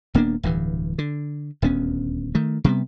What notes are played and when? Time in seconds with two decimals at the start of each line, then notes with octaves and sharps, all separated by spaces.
0.14 D#1 A#3 B3 D4
0.43 D1 G2 E3
0.98 D3
1.62 D#1 D2 B3 C#4
2.35 D#3 A3
2.64 C3 G3 G#3 B3